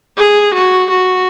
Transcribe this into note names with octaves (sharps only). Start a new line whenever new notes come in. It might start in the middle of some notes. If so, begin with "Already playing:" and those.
G#4
F#4
F#4